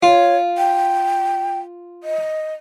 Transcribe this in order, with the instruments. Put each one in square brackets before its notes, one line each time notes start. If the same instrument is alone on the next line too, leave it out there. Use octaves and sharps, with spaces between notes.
[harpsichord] F4 [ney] C#5
[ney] G5
D#5